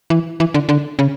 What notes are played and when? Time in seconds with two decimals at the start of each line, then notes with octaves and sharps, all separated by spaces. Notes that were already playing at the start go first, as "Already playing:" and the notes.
0.10 E3
0.40 E3
0.54 D3
0.69 D3
0.99 C#3